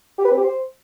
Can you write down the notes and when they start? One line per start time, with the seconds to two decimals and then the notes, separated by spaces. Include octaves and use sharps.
0.18 G4
0.25 B4
0.31 C4
0.37 G4
0.44 C5